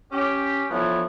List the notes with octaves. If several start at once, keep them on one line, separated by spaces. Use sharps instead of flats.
C#4 G4
E3 F3 A3 B3 D4 C#5